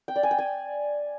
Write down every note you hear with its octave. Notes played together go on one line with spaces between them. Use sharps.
G5
D5
G#5
G5
G#5